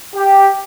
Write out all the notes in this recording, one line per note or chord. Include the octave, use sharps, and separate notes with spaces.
G4